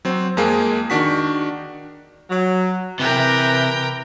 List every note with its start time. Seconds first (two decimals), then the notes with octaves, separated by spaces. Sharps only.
0.05 F#3 C4
0.37 F2 G#3 A#3 G#4
0.90 D#3 D4 F#4 B6
2.30 F#3
3.00 C3 E3 E4 A#4 B4 G5